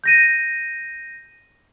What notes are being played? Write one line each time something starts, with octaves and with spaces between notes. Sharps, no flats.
G6 A#6 D#7